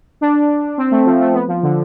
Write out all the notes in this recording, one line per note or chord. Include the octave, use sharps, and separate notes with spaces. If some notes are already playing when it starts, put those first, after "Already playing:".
D4
C4
A3
F3
A3
B3
F3
D3